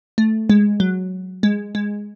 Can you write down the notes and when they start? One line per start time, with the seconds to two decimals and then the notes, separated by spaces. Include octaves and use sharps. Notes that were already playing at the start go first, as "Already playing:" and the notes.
0.18 A3
0.50 G#3
0.80 F#3
1.43 G#3
1.75 G#3